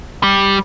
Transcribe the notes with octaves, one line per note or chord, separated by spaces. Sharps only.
G3